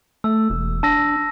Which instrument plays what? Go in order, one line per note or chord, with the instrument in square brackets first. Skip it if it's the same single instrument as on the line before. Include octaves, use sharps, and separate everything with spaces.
[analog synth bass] A3 [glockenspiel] E6
[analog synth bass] E1
[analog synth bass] D4 [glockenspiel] A5 E6 A#6